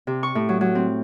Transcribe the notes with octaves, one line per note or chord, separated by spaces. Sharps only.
C3
C#6
A2
F#3
F#3
C4